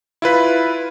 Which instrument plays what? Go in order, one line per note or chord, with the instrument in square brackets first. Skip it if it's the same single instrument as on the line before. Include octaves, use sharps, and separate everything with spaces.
[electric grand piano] E4 F4 B4 B6